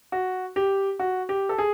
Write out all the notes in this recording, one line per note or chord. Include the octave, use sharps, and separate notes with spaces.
F#4
G4
F#4
G4
A4
G#4